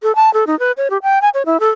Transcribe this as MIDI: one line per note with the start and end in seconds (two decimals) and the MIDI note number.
0.03 0.15 69
0.15 0.32 81
0.34 0.44 69
0.47 0.58 63
0.59 0.72 71
0.77 0.88 73
0.90 0.98 67
1.03 1.21 79
1.22 1.29 80
1.34 1.43 73
1.46 1.60 64
1.60 1.70 69